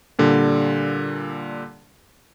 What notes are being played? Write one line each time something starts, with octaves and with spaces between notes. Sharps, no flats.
A#2 D3 G3